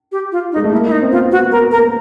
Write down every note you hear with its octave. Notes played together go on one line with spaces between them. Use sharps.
G4
F4
D#4
G#3
A3
A#3 E4
E4
D#4
C4
B3 F4
F#4
B3 A#4
A#4
A#3